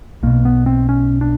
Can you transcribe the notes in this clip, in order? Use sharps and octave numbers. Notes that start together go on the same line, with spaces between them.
B1 B2 A#3
B3
C4
C#4
D4